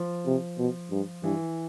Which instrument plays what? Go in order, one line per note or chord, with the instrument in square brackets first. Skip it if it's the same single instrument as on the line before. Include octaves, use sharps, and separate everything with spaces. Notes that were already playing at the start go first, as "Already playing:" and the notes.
Already playing: [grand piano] F3
[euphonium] C3
B2
G2
[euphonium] G2 [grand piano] E3